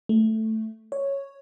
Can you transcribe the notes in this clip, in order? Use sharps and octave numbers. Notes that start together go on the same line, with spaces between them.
A3
C#5